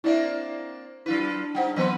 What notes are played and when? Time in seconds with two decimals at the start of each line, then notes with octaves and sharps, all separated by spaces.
0.04 A#3 C4 D4 E4 D5 E5
1.06 F#3 D4 E4 F4 B4
1.55 G3 D#4 C5 F#5 G5
1.76 E3 F#3 B3 C4 B4 C5 C6